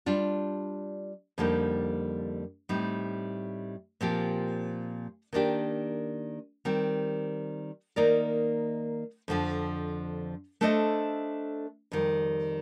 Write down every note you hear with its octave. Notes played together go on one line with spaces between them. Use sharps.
G3 D4 F4
F2 D3 G3 A#3 D#4
A2 G3 C4 D#4
A#2 F3 C4 G4
D#3 A#3 D4 G4
D#3 G3 C4
D#3 A#3 D#4 A#4 D5
F2 D3 F3
A3 D4 A4 C5 D#5
F2 D#3 G3